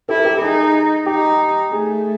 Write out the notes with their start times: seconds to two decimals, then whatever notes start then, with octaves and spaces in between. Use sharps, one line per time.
0.09 E4 G4 A4
0.19 A#4
0.25 G4 A4
0.42 D#4 G#4
1.06 D#4 G4
1.71 A3 G#4